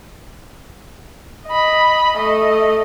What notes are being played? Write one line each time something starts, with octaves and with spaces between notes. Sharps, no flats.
D#5 B5
A3 D#5